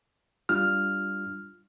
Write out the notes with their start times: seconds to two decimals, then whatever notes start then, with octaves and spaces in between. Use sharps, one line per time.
0.49 G3 D4 F4 F6